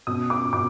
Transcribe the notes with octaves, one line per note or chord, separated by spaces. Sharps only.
B2 D#6
D6
B2 D6